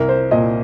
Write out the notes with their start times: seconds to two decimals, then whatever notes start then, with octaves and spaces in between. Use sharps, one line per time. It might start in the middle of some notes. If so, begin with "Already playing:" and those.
Already playing: C2 A#4
0.09 C5
0.31 A#2 D#5